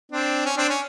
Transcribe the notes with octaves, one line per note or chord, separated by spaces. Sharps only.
C4 D4
C#4
C4 D4
C#4